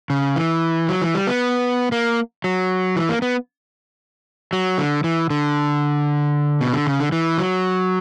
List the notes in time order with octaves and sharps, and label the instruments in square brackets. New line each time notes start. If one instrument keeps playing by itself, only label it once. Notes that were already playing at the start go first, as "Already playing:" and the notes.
[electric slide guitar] C#3
E3
F#3
E3
G3
B3
A#3
F#3
E3
A#3
B3
F#3
D3
E3
D3
B2
D3
C#3
D3
E3
F#3